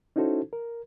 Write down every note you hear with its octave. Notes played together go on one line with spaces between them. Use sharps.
C#4 D#4 E4 F#4 A4 C5
A#4